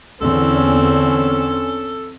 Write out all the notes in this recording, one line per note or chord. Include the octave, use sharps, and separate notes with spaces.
E2 D3 C4 C#4 A4